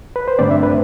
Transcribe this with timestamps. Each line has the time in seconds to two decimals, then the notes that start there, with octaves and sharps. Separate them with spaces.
0.16 B4
0.28 C5
0.39 G2 D3 A3 C4 D5
0.51 E5
0.63 B4